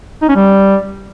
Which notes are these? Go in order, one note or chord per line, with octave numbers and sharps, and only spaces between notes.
D#4
C#4
G3